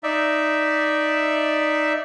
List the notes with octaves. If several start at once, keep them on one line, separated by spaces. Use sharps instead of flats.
D#4 D5 E5